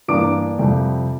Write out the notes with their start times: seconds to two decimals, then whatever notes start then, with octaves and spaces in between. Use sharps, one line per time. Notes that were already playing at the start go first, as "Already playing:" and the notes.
0.08 G2 E3 G3 A#3 D4 D6 D7
0.59 F2 C3 G3